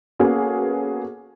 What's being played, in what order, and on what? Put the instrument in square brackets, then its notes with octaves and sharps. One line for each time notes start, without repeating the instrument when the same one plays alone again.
[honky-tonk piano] A#3 B3 C#4 F#4 G#4 A4